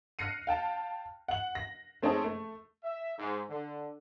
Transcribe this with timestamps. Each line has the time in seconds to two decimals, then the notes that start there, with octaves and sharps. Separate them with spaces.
0.19 F6 F#6 A#6 C7 C#7 D#7
0.47 F5 G5 A5
1.28 F#5 F#7
1.55 A#6
2.02 A3 C4 C#4 D#4 G#4 A4
2.24 A3
2.83 E5
3.18 G#2
3.49 D3